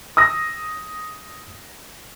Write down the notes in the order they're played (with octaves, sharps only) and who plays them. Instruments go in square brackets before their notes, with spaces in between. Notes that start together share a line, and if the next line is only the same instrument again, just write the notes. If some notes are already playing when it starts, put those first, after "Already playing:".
[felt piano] D#6 E6 A#6